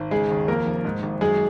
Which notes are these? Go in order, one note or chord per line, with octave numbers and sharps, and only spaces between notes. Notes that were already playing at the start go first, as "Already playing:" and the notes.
Already playing: G#1
C#3 G#3 G#4
D#2
F2 A#3 A#4
F1
G#2
G#1
F#2 G#3 G#4